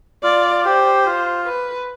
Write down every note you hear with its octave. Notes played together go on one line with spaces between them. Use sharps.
F4 D5
G4 C5
F4
B4